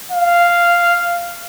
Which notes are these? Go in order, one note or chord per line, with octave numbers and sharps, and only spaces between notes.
F5